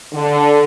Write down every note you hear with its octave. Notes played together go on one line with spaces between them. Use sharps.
D3